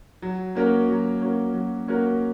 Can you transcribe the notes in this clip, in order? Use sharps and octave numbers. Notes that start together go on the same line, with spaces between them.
F#3
A#3 C#4 F#4 A#4
F#3
A#3 C#4 F#4 A#4
F#3
A#3 C#4 F#4 A#4